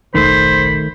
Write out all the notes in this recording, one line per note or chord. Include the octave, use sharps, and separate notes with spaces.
F1 A#1 D#3 A3 C5 B5